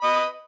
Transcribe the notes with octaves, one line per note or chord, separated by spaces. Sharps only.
B4 D#5 B5